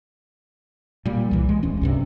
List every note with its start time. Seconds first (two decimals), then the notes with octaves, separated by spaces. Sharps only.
1.05 A#2 G3
1.31 C2 E3
1.49 G#3
1.63 D1 C#4
1.81 B1 G2 C3